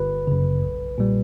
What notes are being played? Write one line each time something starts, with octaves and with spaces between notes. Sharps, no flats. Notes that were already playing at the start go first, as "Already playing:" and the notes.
Already playing: G1 B4
F#2 C#3
B1
A#2 G3